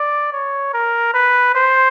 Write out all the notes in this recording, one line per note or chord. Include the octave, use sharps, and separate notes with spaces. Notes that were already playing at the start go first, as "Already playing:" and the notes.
Already playing: D5
C#5
A#4
B4
C5